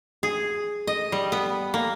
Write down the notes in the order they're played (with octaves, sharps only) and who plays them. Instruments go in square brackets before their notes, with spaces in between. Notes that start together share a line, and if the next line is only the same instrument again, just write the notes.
[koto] G#4
D#5
G3
B3
A#3